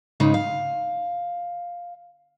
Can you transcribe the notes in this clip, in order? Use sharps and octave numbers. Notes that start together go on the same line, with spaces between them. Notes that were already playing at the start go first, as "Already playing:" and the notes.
G#2 C#3 D#4
F5